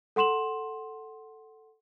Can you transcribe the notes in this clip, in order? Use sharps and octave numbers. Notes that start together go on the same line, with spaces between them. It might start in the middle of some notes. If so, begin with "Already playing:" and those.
A4 F#5 C6 E7 F#7